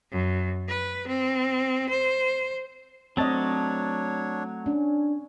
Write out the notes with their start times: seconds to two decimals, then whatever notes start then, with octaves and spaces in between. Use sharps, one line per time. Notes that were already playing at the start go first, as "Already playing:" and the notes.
0.11 F#2
0.68 B4
1.07 C4
1.90 C5
3.17 F#3 A3 C4 D4 C#5 D#5 A5
4.66 C#4 D4